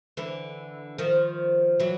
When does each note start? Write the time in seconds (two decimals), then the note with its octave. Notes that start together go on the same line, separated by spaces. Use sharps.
0.17 D3 E3
0.98 D#3 F3
1.80 E3 F#3